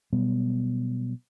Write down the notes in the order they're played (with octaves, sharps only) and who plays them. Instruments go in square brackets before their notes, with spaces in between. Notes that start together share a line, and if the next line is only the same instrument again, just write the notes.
[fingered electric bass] B2 F#3 G3 B3